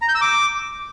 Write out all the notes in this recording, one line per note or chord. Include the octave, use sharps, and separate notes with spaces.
A#5
G6
E6
D6